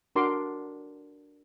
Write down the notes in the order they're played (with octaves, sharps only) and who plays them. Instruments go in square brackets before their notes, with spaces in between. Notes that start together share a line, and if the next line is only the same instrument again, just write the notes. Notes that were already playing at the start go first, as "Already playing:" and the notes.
[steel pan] D4 F#4 A#4 C6 D6